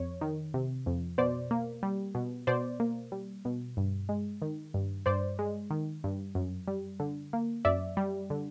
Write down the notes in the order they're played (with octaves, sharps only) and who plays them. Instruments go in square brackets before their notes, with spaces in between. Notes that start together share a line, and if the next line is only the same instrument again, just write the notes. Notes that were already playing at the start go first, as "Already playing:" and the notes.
Already playing: [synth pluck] F2 C#5
D#3
C3
F2
B2 C5 D5
A#3
G3
B2
B2 C5 D5
A#3
G3
B2
G2
G#3
D#3
G2
G2 C5 D5
G#3
D#3
G2
F#2
G3
D3
A#3
F#2 D5 E5
G3
D3